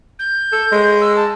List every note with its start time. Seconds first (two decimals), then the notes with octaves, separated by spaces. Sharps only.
0.19 G6
0.52 A4
0.72 G#3
1.01 E6
1.16 A5